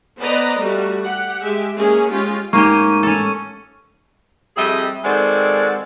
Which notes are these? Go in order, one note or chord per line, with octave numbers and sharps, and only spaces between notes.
B3 B4 C5 D5 D#5 A#5
G3 A3 F#4
G4 F#5
G#3 G4 E5
G#3 A#3 C#4 G#4
G#3 C#4 F4 G4
A2 G#3 A#3 C#4 D#4 G4 A#5 C#6
C#4 A4
F2 G3 G#4 D#5 E5
D#3 G#3 C4 F#4 A4 D5